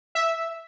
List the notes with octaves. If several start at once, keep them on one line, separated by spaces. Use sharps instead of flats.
E5